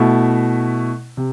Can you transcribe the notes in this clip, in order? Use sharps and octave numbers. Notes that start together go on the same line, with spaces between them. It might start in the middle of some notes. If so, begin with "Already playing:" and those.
Already playing: B2 A3 E4
C3